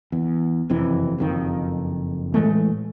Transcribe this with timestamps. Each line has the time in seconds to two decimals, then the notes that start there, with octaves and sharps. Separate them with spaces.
0.12 E2
0.70 F#1 F2 C3 E3
1.18 F#1 F2 D#3
2.34 A2 E3 G#3 A3